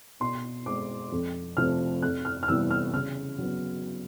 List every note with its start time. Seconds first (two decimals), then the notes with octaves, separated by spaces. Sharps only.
0.20 B2 C6
0.66 G#3 C4 D6
1.12 F2
1.57 C3 F3 A3 C4 F6
2.02 F2 F#6
2.25 F6
2.43 F6
2.48 C3 E3 G3 B3 E6
2.71 F6
2.93 C#3 F6
3.38 F#3 B3